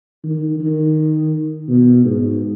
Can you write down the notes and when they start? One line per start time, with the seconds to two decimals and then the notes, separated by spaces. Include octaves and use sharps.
0.24 D#3
0.60 D#3
1.69 B2
2.05 G#2